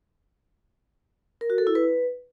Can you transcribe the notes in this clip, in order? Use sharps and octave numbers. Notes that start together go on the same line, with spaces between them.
A#4
F#4
A4
E4
B4